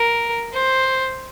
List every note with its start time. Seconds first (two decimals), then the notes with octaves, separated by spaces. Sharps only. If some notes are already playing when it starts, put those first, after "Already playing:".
Already playing: A#4
0.53 C5